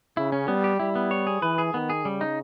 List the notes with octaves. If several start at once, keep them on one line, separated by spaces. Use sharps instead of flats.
C#3 E4
C#4
G3 B3
G4
G3 E4
B3
C#5
G#4
E3 B4
G#4
D#3 B3
G#4
C#3 G3
D#4